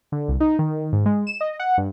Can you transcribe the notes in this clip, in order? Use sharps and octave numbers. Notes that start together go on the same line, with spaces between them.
D3
C2
D#4
D#3
G#2
G#3
E7
D#5
F#5
G2